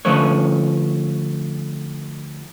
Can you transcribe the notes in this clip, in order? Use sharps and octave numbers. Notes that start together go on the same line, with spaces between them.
D3 F3 A3 C#4 B4 C#5